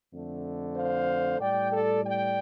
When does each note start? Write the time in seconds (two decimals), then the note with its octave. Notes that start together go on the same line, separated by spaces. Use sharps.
0.14 F2 D3 A3
0.76 C5 F5
1.40 A2 G3 D5 G5
1.72 A4 D5
2.04 D5 G5